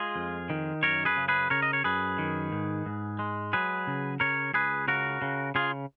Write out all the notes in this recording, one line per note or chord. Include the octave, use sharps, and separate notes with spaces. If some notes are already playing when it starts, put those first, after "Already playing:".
Already playing: G#3 F4 G#4
F2
D#3
F#2 A#4 C#5
G#4 B4
C#3
G#4 B4
C#3 A#4 C#5
D#5
C#5
F#2 G#4 B4
D#3
G#2
G#2
G#3
F#3 G#4 B4
C#3
C#3 A#4 C#5
C#2 G#4 B4
C#3 F#4 A#4
C#3
C#3 F4 G#4